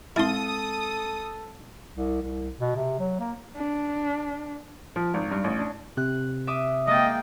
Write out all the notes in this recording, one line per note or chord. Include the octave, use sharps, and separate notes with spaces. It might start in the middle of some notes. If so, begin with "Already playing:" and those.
G#3 C4 E4 A4 C6 D#6
C2
C2
B2
C3
F#3
A#3
D4
F3
G#1
G2
A1
D4
C3 F#6
E5 D6 D#6
G#3 A#3 D#5 G5 A6